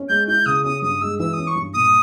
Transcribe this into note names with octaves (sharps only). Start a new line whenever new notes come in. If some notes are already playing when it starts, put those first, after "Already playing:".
Already playing: C#4
G#3 G6
E4 G6
C#3 D#6
C#4 D#6
G2 D#6
G#3 E6
E3 E6
C#4 D#6
C#6
G2
A#2 D#6